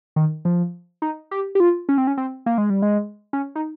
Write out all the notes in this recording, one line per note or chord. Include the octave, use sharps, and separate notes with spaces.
D#3
F3
D#4
G4
G4
F4
C#4
C4
C#4
C4
A#3
G#3
G3
G#3
C#4
D#4